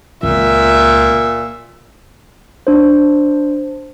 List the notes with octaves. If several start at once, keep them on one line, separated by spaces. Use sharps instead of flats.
C#2 A#2 E5
D4 C5